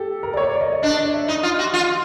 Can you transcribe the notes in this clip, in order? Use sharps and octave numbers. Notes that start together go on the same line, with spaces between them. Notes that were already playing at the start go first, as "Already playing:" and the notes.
Already playing: G4 A4
A#4
D5
C#5
D5
C#5
D#5
D#5
D4 D#5
D#5
E5
D#4 D#5
F4
F#4
F4